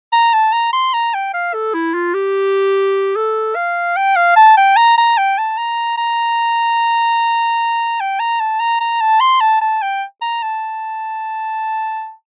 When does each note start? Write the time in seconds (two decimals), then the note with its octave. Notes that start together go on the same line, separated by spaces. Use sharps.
0.12 A#5
0.33 A5
0.53 A#5
0.73 C6
0.94 A#5
1.14 G5
1.33 F5
1.54 A4
1.74 E4
1.94 F4
2.14 G4
3.16 A4
3.55 F5
3.96 G5
4.16 F5
4.36 A5
4.57 G5
4.76 A#5
4.98 A#5
5.17 G5
5.38 A5
5.58 A#5
5.97 A#5
8.00 G5
8.19 A#5
8.40 A5
8.60 A#5
8.80 A#5
9.01 A5
9.20 C6
9.40 A5
9.61 A5
9.82 G5
10.22 A#5
10.43 A5